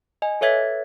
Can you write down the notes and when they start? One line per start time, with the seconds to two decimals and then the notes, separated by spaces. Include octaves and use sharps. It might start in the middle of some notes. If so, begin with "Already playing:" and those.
0.22 D#5 G#5
0.41 A4 B4 C#5 E5 G#6 B6